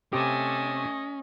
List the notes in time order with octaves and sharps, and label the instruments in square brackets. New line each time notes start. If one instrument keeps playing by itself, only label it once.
[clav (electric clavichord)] C3 G4 [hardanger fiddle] A3 G#5 [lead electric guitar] C#4 [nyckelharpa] D#5